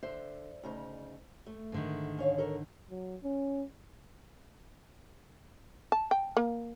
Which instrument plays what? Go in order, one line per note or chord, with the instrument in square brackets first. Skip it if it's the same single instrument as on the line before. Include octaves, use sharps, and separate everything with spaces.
[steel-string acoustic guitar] D3 [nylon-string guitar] C5 E5
[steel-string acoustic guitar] D2 C#3 D#4
A3
[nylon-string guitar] G#2 D3 D#3
[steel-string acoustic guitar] C#4 C#5 F5
A4 A#4 C#5
[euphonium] F#3
C#4
[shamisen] A5
G5
A#3